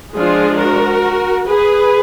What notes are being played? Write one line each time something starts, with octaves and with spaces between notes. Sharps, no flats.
F3 G#3 D4 F4 G#4
F#4 A#4
G#4 B4